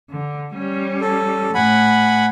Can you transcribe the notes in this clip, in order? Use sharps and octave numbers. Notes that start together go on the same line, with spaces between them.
D3
G3 C#4
A4
A2 F#5 G#5 B5